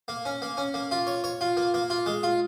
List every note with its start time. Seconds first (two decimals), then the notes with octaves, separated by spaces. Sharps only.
0.08 A#3
0.25 C#4
0.42 A#3
0.57 C#4
0.74 A#3
0.91 F4
1.07 C#5
1.24 C#5
1.41 F4
1.57 A#3
1.74 A#3
1.90 F4
2.06 G#3
2.23 F4